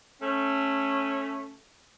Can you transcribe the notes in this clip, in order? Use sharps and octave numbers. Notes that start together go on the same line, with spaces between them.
A3 C#4